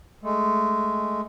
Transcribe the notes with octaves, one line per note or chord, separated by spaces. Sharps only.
G#3 A3